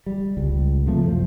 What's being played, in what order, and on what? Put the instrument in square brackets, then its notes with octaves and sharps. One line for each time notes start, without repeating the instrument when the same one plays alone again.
[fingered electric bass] G3
C#2
C3 F3 A3
F#1 C#3 F3